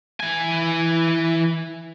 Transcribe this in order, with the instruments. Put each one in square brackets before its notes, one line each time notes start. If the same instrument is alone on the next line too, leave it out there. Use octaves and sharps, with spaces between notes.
[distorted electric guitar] E3 G#5